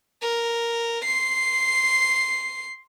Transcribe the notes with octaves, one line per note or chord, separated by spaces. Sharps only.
A#4
C6 C7